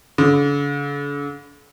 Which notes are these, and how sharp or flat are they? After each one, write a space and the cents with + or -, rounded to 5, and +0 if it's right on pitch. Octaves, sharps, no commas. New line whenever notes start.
D3 -45